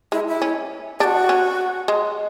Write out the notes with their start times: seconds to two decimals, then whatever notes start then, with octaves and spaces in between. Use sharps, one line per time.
0.12 G#3 E4
0.28 E4
0.42 C#4
1.00 D4 F#4 G#4
1.29 C#4
1.88 G#3